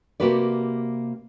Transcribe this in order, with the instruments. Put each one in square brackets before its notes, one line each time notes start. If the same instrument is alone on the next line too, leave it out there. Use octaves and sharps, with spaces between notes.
[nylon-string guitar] C3 A#3 F#4 G4 B4 D5